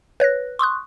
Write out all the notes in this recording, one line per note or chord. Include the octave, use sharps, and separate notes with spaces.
B4 C#5 F#6 A#6
C6 C#6 D#6 F#6